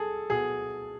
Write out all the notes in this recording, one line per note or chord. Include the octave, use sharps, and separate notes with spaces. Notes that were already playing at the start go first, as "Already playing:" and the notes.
Already playing: G#4 A4
B2 G#4